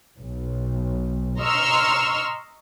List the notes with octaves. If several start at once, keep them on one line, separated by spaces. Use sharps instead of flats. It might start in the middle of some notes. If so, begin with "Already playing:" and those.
B1
D#5 A#5 C6 C#6 E6 F6